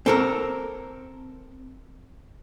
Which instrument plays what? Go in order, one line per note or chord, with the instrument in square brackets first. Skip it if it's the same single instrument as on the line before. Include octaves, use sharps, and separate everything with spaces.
[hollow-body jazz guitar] C4 A4 A#4